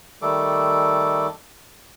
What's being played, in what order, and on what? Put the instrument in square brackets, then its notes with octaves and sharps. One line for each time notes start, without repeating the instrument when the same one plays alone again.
[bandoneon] D#3 G3 A3 A4 D6